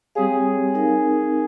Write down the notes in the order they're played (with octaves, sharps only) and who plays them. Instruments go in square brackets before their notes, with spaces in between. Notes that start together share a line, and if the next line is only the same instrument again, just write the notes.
[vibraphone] G3 C4 G4 C#5 F5 [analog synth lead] G#4
[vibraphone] C4 D#4 A#4 F5